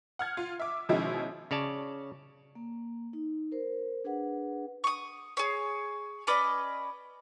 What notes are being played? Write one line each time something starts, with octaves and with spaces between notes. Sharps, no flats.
F#5 F6 G#6
F4
E5 D6
B2 D#3 F3 G#3 C#4 E4
C#3 C#5 D5 A5
A#3
D#4
A#4 C5
D4 G#4 B4 F#5
C#6 D#6
G#4 C#5
C#4 B4 D5 D#5